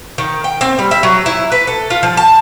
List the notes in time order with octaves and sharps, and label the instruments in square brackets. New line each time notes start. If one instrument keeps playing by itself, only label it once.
[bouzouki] D#3
G5
C4
G3
E5
F#3
E4
B4
A4
F4
F3
A5